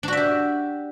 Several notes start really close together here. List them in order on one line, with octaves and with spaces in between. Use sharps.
D4 F#4 E5 G4